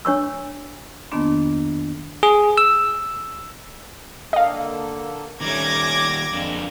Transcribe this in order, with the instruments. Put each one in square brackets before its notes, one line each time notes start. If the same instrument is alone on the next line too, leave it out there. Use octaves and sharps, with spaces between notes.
[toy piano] D4 C#5 C#6 E6
[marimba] F2 D#3 A#3 B3 D4 C6
[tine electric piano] G#4
E6
[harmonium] D3 A#3 A4 [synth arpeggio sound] D#5 F5
[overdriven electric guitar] D#3 G3 [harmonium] A3 C#4 [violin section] D6 G#6 A#6
[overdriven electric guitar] F2 D4 [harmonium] G#3 A#3 C4